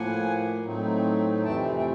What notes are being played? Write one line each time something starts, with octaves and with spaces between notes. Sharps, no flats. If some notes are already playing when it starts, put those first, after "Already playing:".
Already playing: A2 F3 A#3 F#5 G#5
A2 F#3 A3 C4 D#4
F2 C3 E3 A3 C4 G5 A5
G5